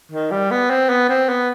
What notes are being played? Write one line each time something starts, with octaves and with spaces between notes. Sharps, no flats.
D#3
G3
B3
C4
B3
C4
B3